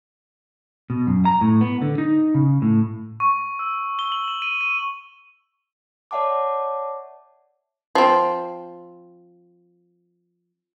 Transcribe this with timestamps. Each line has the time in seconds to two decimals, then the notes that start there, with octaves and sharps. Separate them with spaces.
0.90 B2
1.07 F#2
1.25 A#5
1.41 A2
1.61 B3
1.82 D3
1.98 D#4
2.35 C#3
2.62 A2
3.20 C#6
3.59 E6
3.99 G7
4.12 F#7
4.28 E7
4.42 D#7
4.61 D#7
6.11 C#5 D5 E5 F#5 A5 D6
7.95 F3 C4